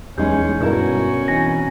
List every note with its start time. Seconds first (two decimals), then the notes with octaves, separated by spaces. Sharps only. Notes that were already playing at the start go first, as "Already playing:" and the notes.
0.18 E2 G#3 C#4 D#4 G#4 G6
0.60 G2 B2 C#4 E4 F#4 A#4
1.28 E3 C4 D#4 G#5 A#6